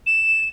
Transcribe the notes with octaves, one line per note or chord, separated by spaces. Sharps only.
E7